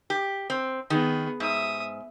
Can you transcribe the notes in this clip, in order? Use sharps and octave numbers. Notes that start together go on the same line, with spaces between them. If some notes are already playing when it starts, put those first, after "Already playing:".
G4
C4
D#3 B3 G#4
G#2 E5 D#6